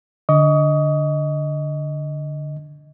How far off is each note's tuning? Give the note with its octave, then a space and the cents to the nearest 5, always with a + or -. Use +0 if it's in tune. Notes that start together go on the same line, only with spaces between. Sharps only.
D3 +0 D#5 +10 C#6 +40